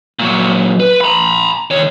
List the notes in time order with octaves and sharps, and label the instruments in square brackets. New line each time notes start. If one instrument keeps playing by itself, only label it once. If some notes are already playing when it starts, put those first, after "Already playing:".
[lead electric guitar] A#2 F#3
B4
A#5 B5
D#3 C#5